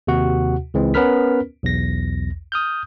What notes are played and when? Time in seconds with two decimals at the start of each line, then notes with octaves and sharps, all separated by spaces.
0.07 D#2 C3 F#4 F#5
0.74 C#2 E3 G#3 C4
0.94 B3 C#4 A#4 B4 F6 B6
1.63 B1 E2 A#6
2.52 D#6 F6 G6